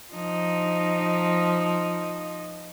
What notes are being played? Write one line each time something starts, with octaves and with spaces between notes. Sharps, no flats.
F3 D#4